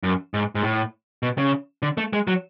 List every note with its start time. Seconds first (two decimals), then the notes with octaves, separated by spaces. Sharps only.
0.03 F#2
0.34 G#2
0.55 G#2
0.63 A2
1.23 B2
1.38 C#3
1.82 D3
1.97 A3
2.13 G#3
2.27 F#3